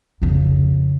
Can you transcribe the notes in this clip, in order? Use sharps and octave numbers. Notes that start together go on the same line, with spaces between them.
F2 C#3